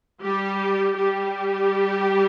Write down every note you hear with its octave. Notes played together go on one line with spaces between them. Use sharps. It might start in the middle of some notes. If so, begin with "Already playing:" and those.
G3 G4
G3 G4